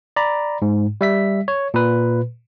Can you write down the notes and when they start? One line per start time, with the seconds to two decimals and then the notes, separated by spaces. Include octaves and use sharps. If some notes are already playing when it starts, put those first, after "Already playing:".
0.16 D5 A#5 B5
0.62 G#2
1.01 G3 E5 B6
1.48 C#5
1.74 A#2 B4